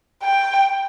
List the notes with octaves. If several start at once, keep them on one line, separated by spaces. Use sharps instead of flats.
G5